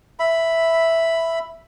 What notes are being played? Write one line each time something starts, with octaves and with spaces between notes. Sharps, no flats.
E5 B5